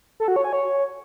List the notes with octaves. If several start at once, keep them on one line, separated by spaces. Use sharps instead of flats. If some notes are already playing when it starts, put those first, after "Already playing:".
A4
F#4
C#5
G#5
C#5